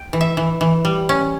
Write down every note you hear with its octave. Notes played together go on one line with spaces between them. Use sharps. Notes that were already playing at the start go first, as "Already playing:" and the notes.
Already playing: G5
E3
E5
E3
E3
G3
C#4